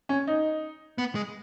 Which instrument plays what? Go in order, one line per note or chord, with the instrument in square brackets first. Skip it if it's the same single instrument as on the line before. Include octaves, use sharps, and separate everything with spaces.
[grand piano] C#4
D#4
[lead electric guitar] B3
G#3